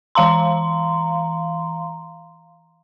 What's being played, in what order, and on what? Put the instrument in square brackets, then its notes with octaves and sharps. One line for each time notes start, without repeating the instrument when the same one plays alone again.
[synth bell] E3 F5 A#5 C6